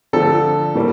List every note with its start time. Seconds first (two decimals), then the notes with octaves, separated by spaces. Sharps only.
0.13 D3 F3 A3 A4
0.75 A2 G3 A#3